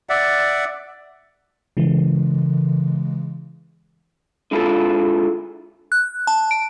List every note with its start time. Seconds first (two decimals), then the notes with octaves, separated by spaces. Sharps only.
0.09 D5 E5 F#5
1.77 C#3 E3 G#3
4.51 D3 G#3 E4 F4 A4
5.92 F#6
6.27 A5
6.51 D7